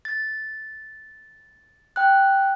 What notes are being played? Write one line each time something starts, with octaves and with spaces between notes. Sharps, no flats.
A6
G5 F#6